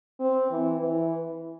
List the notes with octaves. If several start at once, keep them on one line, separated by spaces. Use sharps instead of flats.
C4
E3
E3